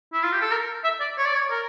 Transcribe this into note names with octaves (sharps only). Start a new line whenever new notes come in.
E4
F4
G4
A4
A#4
E5
D5
C#5
D5
C#5
A#4